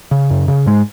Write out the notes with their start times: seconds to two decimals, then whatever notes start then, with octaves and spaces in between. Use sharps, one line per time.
0.11 C#3
0.30 F#2
0.48 C#3
0.66 G#2 G#3